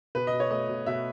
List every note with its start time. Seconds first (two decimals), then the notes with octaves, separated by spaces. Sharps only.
0.15 B2 B4
0.27 D#5
0.33 B2
0.40 C#5
0.51 A3 D#5
0.69 B2
0.86 B2 E5